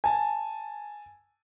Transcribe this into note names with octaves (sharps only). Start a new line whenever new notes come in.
G#5 A5